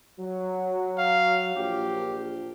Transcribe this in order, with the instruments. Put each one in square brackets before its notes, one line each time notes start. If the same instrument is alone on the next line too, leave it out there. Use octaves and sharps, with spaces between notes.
[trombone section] F#3
[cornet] F5
[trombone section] A#1 [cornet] G4